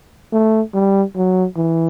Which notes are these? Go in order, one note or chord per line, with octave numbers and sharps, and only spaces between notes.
A3
G3
F#3
E3